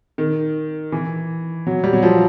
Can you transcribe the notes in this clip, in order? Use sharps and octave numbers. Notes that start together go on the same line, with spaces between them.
D#3
E3
F#3
G3
F#3
F3